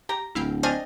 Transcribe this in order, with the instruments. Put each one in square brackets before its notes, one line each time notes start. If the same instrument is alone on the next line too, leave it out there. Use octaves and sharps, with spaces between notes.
[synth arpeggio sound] G4 [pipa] A#5
[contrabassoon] D1 [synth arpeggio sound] E4 F5 G5
[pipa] C4 D4 D#5 [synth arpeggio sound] G#5 F6